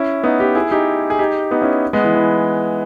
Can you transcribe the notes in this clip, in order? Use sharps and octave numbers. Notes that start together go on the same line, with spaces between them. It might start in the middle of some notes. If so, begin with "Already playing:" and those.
Already playing: C#4 E4
B3 D#4
D#4 G4
E4 G#4
D#4 G4
G#4
D#4 G4
B3 D#4
C#4 E4
G#3 B3
E3
E3